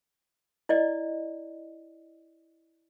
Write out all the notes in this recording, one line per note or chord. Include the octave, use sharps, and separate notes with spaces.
E4 D5 D#5